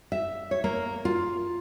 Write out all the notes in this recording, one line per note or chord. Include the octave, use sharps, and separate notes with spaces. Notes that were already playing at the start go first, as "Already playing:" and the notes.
E5
C#5
A#3
F4